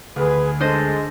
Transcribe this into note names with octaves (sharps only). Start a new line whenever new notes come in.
D2 G#4 B4
G#3 D4 A4 C5 D#5